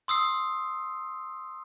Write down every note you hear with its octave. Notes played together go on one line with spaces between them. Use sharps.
C6 D#6 E6 C7